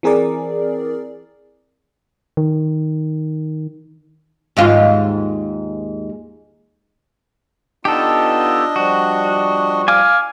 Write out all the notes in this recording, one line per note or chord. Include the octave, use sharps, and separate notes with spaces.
E3 C4 G#4 A#4 D5
D#3
D#2 G#2 F4
B3 D4 D#4 F4 G4 A4 D#5
F3 G3 F#4
F5 G#5 D6